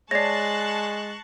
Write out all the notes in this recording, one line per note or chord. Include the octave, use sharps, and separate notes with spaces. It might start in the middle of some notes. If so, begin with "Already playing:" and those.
G#3 C#5 D5 A5 C#6 F#6 A#6 C7